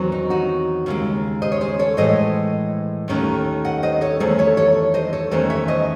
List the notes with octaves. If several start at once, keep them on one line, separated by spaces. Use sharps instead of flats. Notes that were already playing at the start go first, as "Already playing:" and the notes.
Already playing: E2 D#3 F#3 C4
D#4
D#4 F#4
D#2 C#3 G#3
C5 D#5
C#5
G#4 C5
A4 C#5
A2 E3 G#3 C5 D#5
D#2 D#3 A3 C#4
D#5 F#5
C5 D#5
A4 C#5
E2 D#3 A3 G#4 C5
A4 C#5
A4 C#5
C5 D#5
A4 C#5
E2 D#3 A3 C#4 C5 D#5
C#5 E5
C5 D#5